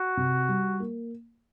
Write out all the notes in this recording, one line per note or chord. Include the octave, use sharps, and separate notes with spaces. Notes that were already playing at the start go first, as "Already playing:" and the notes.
Already playing: F#4
C3
G3
A#3